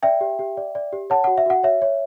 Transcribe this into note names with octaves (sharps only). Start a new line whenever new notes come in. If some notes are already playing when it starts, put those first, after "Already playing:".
D5 E5 G5
G4
G4
D5
D5
G4
C#5 F#5 A5
F#4 F#5
E5
F#4 F#5
C#5 E5
C#5